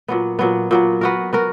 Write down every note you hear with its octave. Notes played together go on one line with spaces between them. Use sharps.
A#2 F#3 B3
A#2 F#3 B3
A#2 F#3 B3
B3 F#4 A#4
B3 F#4 A#4